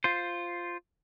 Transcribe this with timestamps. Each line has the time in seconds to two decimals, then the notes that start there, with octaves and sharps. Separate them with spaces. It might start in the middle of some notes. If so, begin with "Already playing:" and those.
0.04 F4 C5